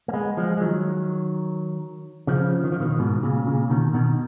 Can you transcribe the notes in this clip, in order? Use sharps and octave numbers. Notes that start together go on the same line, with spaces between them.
A#3
G#3 B3
F3 G#3
G#3
D#3 F#3
C#3 F3
D#3
F3
B2 D#3
G#2 B2
A#2 C#3
A#2 C#3
B2 D#3
B2 D#3